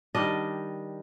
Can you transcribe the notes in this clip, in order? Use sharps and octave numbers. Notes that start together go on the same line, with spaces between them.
D#3 G3 D4 D#5